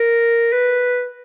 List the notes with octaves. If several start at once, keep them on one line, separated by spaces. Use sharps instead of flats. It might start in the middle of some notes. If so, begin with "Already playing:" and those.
Already playing: A#4
B4